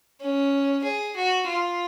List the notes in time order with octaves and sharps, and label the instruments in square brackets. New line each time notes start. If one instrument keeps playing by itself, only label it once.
[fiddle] C#4
G#4
F#4
F4